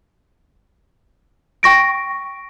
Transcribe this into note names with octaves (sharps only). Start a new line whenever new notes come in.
G5 C#6 A#6 D7